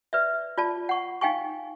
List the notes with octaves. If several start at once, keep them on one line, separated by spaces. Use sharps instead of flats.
B4 D5 E5
F4 D5 A5
F#5 C#6
D#4 F5 G5 G#5 C#6